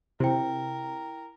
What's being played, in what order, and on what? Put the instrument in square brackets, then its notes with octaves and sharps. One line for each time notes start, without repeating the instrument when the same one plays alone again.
[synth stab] C3 [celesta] E4 G5 [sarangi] A#4